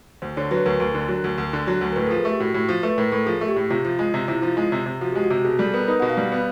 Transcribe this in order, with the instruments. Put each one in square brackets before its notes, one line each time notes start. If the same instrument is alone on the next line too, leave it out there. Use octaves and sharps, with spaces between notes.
[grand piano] D2 [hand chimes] C5
[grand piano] D3 [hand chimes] C#5
[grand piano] F#3 [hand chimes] B4
[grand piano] D2 [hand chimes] A#4
[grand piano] D2
D3
F#3
D2
D2
D3
F#3
D2
[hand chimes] A#4
[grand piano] A2 [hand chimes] B4
[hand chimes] A4
[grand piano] F3
[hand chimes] G#4
[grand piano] A3 [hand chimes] G4
[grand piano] A2 [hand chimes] F#4
[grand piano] A2
F3
[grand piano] A3 [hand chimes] B4
[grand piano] A2 [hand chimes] A#4
[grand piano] A2 [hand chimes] A4
[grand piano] F3 [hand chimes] G#4
[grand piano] A3
[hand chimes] G4
[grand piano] A2
[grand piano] C3 [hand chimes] F4
[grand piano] F3 [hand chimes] F4
[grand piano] G#3 [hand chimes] F4
[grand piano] C3 [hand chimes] F4
[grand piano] C3 [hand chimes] E4
[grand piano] F3 [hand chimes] F4
[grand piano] G#3
C3
C3
[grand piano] F3 [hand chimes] F#4
[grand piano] G#3 [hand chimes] G4
[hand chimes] F#4
[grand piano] C3
[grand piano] B2 [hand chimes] G#4
[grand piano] G3 [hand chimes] A4
[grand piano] B3 [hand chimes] A#4
[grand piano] D#4 [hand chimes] B4
[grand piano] B2 [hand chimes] F#5
[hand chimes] F5
[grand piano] G3
B3